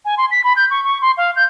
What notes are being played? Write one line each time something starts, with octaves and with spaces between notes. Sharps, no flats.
G#5
C6
B6
B5
G6
C#6
C#6
C6
F5
G6